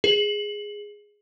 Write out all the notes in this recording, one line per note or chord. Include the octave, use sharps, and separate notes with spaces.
G#4